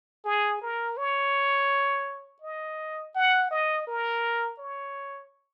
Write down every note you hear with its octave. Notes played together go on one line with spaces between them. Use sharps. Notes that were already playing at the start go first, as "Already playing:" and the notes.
G#4
A#4
C#5
D#5
F#5
D#5
A#4
C#5